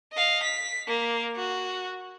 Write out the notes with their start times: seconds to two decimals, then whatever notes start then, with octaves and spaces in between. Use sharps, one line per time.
0.13 D#5 F5
0.43 B6
0.87 A#3
1.36 F#4